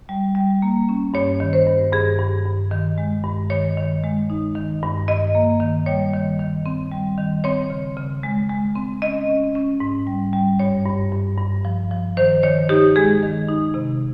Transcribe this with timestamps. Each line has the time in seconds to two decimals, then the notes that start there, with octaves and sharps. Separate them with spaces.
0.09 G3
0.35 G3
0.62 A#3
0.89 C#4
1.14 G2 C#5
1.40 D#3
1.53 C5
1.67 G2
1.93 G2 G#4
2.19 G2
2.46 G2
2.72 D#3
2.98 G#3
3.24 G2
3.50 D#3 C#5
3.77 D#3
4.04 G#3
4.30 D#4
4.55 D#3
4.82 G2
5.08 G2 D#5
5.35 A#3
5.60 D#3
5.86 G3 C#5
6.13 D#3
6.40 D#3
6.66 C4
6.91 G3
7.18 D#3
7.44 C4 C#5
7.70 C#3
7.97 C#3
8.23 G#3
8.50 G#3
8.75 C4
9.02 C#4 D#5
9.29 C#4
9.55 C#4
9.80 G#2
10.07 G3
10.33 G3
10.59 G2 C#5
10.86 G2
11.12 G2
11.38 G2
11.65 F3
11.91 F3
12.17 D#3 C5
12.43 D#3 C#5
12.69 D#4 G4
12.96 G#3 G#4
13.23 D#3
13.49 D#4
13.74 C3